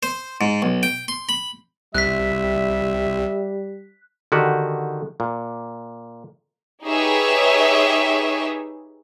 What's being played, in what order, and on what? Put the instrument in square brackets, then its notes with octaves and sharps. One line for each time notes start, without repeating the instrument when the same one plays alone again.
[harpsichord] C5
G#2
B1
G5
C6
B5
[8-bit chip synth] C2 [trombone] G3 [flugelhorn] E5 [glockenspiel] F#6 B6
[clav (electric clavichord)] D3 D#3 F#4 G4
A#2
[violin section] D#4 G4 G#4 B4 C#5 E5